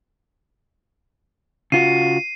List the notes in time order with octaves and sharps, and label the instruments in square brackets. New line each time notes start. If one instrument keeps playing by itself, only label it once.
[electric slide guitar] C#3 F4 F#4 [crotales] C7 D#7